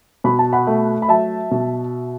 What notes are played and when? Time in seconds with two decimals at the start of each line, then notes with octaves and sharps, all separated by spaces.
0.24 B2 B5
0.39 A5
0.53 F#5 B5
0.67 A3
1.02 B5
1.09 F#3 E5 A5
1.51 B2